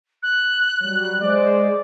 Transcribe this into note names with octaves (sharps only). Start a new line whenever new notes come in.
F#6
F#3 G3
G#3 C5 D5